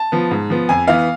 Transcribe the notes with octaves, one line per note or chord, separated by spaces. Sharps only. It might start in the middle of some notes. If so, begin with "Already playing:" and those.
Already playing: A5
F3 B3
G#2
F3 B3
F2 G#5
E3 B3 F5